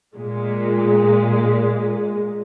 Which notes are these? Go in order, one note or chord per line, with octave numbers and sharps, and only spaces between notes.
A#2 G#3